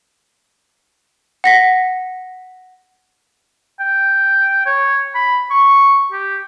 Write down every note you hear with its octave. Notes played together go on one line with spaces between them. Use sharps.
F#5 A#6 B6
G5
C#5
B5
C#6
G4